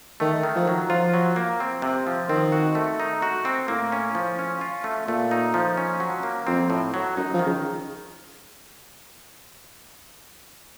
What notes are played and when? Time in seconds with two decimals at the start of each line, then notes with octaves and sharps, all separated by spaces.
0.20 D#3 A3
0.43 D#3
0.56 F3
0.67 F#3
0.89 F3 F4
1.14 F#3
1.36 A#3
1.60 C4
1.82 C3
2.07 F3
2.29 D#3 C4
2.52 F#4
2.75 A3
3.00 D#4
3.22 F#4
3.45 C4
3.68 A2 A#3
3.92 C#4
4.15 F3
4.39 C#4
4.61 F4
4.84 A3
5.08 A#2 A3
5.31 D#4
5.54 F3
5.77 C#4
6.00 F#3
6.23 A#3
6.47 F2 C4
6.70 A2
6.94 F#3
7.17 F#2 D#4
7.33 F3
7.39 D#3
7.46 C#3